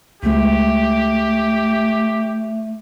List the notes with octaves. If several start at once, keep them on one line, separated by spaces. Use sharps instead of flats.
C#2 G#3 A3 G4